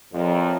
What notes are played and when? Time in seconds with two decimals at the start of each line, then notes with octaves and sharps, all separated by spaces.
0.13 F2 F3 A3 E4 A#4 C#5